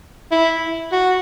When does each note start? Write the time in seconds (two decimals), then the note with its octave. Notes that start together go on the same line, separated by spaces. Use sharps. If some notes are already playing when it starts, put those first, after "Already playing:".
0.31 E4
0.92 F#4